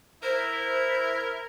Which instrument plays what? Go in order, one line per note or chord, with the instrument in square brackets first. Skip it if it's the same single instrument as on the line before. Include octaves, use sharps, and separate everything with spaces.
[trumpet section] E4 [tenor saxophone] A#4 [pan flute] C5